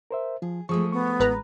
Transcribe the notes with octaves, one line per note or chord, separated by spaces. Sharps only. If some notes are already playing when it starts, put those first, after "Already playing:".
A#4 C5 E5
F3 G#4
F3 G#3 A3 G#4 C#6 D#6
B3 C#6
A1 G#3 B4 A#5